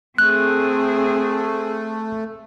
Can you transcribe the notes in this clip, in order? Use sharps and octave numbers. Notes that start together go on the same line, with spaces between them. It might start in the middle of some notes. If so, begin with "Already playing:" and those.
A3 C4 G#4 F#6